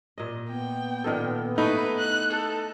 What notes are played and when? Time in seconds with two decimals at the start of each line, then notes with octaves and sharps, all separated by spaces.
0.18 A#2 D#5
0.50 B3 G5
1.04 A#2 D#3 A4
1.58 A3 D#4 E4 B4
1.98 F#6
2.31 A4